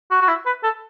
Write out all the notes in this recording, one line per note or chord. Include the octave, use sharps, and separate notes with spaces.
F#4
F#4
E4
B4
A4